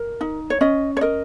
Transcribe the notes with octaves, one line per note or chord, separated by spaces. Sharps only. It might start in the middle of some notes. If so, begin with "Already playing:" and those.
Already playing: A#4
D#4
C#5
C#4 D#5
C#5
A#4 D#5